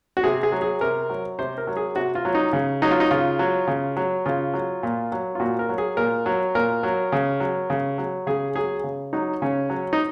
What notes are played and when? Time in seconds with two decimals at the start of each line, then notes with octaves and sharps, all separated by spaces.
0.17 F#4
0.24 C3 G#4
0.43 G#4
0.52 F#3
0.62 G#4
0.81 C3 A#4
1.09 F#3
1.39 C3 C5
1.58 A#4
1.67 F#3
1.77 G#4
1.96 C3 F#4
2.15 F4
2.25 F#3
2.35 D#4
2.53 C#3
2.82 F#3 D#4
2.91 F4
3.00 D#4
3.11 C#3 F4
3.39 F#3
3.67 C#3
3.96 F#3
4.26 C#3 F4
4.53 F#3
4.83 A#2
5.12 F#3
5.35 F4
5.40 A#2 F#4
5.59 A#4
5.69 F#3
5.78 G#4
5.97 A#2 A#4
6.26 F#3
6.55 A#2 A#4
6.83 F#3
7.12 C#3
7.40 F#3
7.70 C#3
7.98 F#3
8.27 C#3 G#4
8.55 F#3 G#4
8.84 C#3
9.13 F#3 D#4
9.42 C#3 C#4
9.70 F#3
9.93 D#4